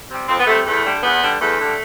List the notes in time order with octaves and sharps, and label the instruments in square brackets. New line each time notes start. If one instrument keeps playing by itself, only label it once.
[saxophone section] C3 G3
F2 C4
B3
C3 G3 A3
E2 A3
D3 G3
E2 B3
D3 G3
E2 A3
D3 G3